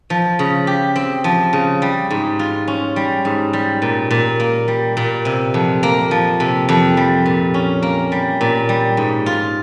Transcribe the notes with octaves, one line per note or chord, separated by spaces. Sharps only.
F3
C#3
G4
C4
F3
C#3
G3
G#2
F4
C#4
G3
G#2
G3
A#2
A#2
A#3
G3
A#2
C3
F2
A#3
F3
C3
F2
G3
A#2
C#4
A#3
G3
A#2
G3
G#2
F4